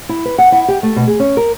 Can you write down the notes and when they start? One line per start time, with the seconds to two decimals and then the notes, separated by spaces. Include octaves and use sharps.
0.09 E4
0.25 B4
0.38 F#5
0.52 E4
0.68 G4
0.83 A3
0.96 B2
1.07 G#4
1.20 C#4
1.37 A#4